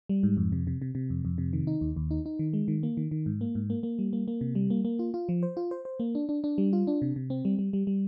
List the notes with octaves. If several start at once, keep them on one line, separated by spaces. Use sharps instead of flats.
G3
G#2
F2
C3
C3
C3
C3
F2
F2
C3
D#3
D#4
D#2
D#2
D#4
D#4
D#3
G#3
D#3
A#3
D#3
D#3
G#2
A#3
G#2
A#3
A#3
G3
A#3
A#3
C3
G3
A#3
A#3
F4
F4
F3
C5
F4
C5
C5
A#3
D4
D4
D4
G3
F4
D4
C3
C3
C4
G3
G3
G3
G3